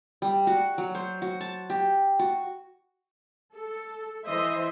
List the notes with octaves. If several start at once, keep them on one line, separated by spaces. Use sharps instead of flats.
G3
F#4
F#3
C5
F#4
A5
G4
F#4
A4
E3 C5 D#5 E5